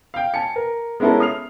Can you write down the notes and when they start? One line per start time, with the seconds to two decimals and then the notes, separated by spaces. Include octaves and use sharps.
0.14 F5 G5
0.34 G#5 A5 C#7
0.56 A#4
1.00 G#3 B3 C#4 E4 A4 A#4
1.20 D#6 F6 C7 F7